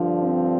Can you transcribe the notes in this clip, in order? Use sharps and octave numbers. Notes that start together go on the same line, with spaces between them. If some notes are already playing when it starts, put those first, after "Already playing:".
Already playing: G2 D3 F3
C4